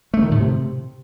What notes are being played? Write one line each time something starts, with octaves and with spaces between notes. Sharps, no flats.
A3
D#3
A2
C3